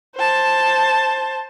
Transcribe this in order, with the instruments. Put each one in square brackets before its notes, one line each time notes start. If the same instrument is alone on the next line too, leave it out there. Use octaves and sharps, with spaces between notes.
[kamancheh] C5 A5